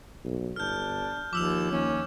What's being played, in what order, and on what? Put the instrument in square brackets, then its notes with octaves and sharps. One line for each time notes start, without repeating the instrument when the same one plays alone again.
[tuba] B1
[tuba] G1 [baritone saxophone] D4 [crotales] F6 G6
[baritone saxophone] D#2 [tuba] F3 [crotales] D6 E6 F7
[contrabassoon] D#2 [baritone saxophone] C#4